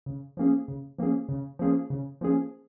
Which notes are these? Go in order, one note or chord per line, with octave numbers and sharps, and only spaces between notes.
C#3
F3 A#3 C#4 G#4
C#3
F3 A#3 C#4 G#4
C#3
F3 A#3 C#4 G#4
C#3
F3 A#3 C#4 G#4